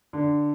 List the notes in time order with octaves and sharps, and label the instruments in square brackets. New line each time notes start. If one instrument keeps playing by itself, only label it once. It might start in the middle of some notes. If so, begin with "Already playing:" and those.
[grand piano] D3